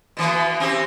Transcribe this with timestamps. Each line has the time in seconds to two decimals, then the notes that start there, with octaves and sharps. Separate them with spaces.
0.17 B2 E3 A#3
0.60 C4 C#4 G4